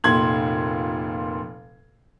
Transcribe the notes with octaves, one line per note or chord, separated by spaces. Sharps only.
F1 A#2 C6 G#6 F#7